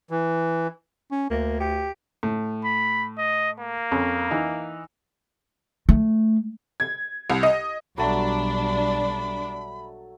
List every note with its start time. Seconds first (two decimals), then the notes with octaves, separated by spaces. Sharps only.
0.10 E3
1.12 C#4
1.30 D2 A#3
1.60 G4
2.23 A2
2.65 B5
3.18 D#5
3.60 A#3
3.91 F2 C#4
4.31 E3 D#4
5.89 A3
6.80 G#6
7.30 C2
7.43 D#5
7.98 B1 F#3 G3 A3 D4 A5 B5